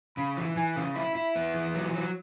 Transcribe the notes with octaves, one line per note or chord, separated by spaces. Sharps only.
C#3 B5
E3
E3 G#5
C#3
E4 B5
E4
B3
E3
F#3
F#3